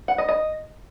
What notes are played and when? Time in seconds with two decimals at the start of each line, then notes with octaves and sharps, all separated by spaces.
0.08 F#5
0.18 D#5
0.29 D#5